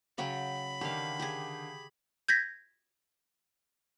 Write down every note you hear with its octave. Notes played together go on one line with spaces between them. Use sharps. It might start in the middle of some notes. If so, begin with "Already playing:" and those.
C#3 F#3 G5 B5
D3 D#3 G4 F5
G4 G#4
G6 G#6 A#6 B6